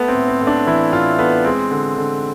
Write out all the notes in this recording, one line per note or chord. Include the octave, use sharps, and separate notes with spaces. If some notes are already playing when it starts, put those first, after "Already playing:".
Already playing: A3 B3
C4
A2
C4
A2
D4
E3 E4
A2 F4
A3 B3
G#3 C4
D3
D3